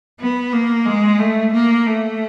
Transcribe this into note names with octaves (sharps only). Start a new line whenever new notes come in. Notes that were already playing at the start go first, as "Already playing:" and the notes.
B3
A#3
G#3
A3
A#3
A3